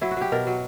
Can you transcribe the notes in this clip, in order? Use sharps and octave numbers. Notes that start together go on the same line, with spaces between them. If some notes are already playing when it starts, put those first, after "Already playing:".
F#3 E4
F#4
F#3 G4
B2 A#4
F#3